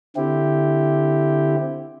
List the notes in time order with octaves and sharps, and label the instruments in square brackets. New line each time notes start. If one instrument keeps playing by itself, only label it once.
[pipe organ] D3 C4 E4 G4